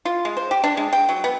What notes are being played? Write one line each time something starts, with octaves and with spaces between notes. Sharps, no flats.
F4
G#3
C5
G4
D4
G#3
G5
F#3
B3